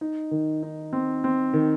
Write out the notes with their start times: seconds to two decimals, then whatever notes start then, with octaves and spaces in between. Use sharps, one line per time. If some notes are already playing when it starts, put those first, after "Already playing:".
0.01 D#4
0.31 D#3
0.63 D#4
0.93 C4
1.24 C4
1.54 D#3